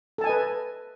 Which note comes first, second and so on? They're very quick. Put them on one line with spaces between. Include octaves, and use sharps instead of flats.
A4 A5 G#5 D#5 B4